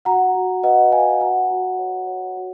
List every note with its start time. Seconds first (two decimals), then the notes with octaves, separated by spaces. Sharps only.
0.05 F#4 F#5 A#5
0.35 F#4
0.63 B4 D#5 F#5
0.92 B4 F5 G#5
1.20 F#4 F#5 A#5
1.51 F#4
1.79 C#5
2.07 C#5
2.37 F#4